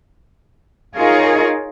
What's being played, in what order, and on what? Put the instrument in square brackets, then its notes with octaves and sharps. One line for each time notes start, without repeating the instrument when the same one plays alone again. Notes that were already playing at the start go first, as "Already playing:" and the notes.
[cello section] D#4 F4 G#4 A#4 C#5